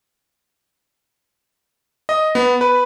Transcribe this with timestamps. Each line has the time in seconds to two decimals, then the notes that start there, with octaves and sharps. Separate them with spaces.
2.09 D#5
2.35 B3
2.61 B4